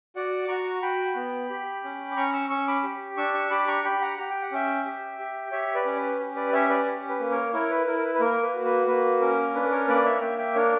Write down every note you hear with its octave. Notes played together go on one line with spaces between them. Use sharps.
F#4 D5 F#5
D6
F#4 A#5 C#6
F#4 G5 B5
B3
G4
C#4
D6
C#4 A#5 C#6
C#6 E6
C#4 C#6 E6
B5 D6
G4
D4 C#6 E6
C#6 E6
G4 B5 D6
A#5 C#6
G4 G5 B5
F#5 A#5
G4 A#5
G5
F#5
C#4 E5 G5
G4
G4
G4 C#5 E5
B4 D5
C#4 C#5
B4
G4
B4 D5
C#4 C#5 E5
B4 D5
G4
B4
A#3
A#4 C#5
E4 A#4 C#5
B4
E4 A#4
A#4
B4
B4
A#3 A#4
B4
F#4
B4
A#3 B4
C#4 A#4
D4 B4
A#4 C#5
A#3 B4 D5
C#5 E5
A#5
A#3 E5 G5
E5 G5
D4 A#4 C#5